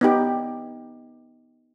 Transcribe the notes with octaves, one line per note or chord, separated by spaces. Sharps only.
B3 D#4 G4